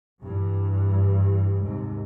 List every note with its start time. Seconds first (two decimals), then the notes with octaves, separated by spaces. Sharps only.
0.23 G2 E3
1.61 D#2 G#2 C3